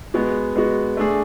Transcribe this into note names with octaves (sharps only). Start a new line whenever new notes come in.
G#3 B3 F#4
G#3 B3 F#4
A3 D4 G#4